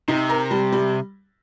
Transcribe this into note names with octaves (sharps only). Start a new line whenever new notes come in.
C3 D#4
A#4
G3
G3